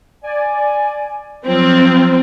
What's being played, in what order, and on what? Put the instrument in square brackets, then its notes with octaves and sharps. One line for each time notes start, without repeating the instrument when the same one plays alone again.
[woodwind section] D5 G#5
[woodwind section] F3 F#3 F4 [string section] C4